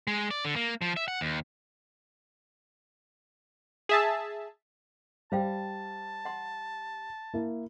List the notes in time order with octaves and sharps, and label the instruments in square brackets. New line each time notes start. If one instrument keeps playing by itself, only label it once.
[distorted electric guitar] G#3
D5
D3
A#3
F3
E5
F#5
D#2
[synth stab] G#4 E5 A5
[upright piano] G3 [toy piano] C5 F5 G5 [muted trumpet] A5
[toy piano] F#5 C6
[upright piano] A#3 E4